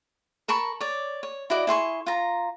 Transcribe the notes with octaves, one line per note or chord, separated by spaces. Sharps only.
A#4 A5 B5 C#6
C#5 D5
C#5
E4 F#4 D5 D#5
E4 G#4 C6 C#6
F4 A#5